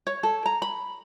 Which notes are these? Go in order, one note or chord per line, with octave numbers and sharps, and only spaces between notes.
C#5
A4
A#5
B5